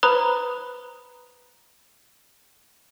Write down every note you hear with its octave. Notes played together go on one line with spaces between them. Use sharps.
B4 C5 A#5 B5 D#6 F#6